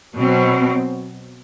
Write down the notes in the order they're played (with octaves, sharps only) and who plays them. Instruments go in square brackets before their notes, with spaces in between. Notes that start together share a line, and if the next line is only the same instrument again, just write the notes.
[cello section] B2 F#3 C4